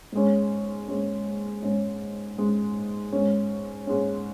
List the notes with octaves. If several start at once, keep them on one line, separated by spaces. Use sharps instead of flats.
G#2 G#3 C#4
G#2 G#3 C#4
G#2 G#3 C#4
G#2 G#3 C#4
G#2 G#3 C#4
G#2 G#3 C#4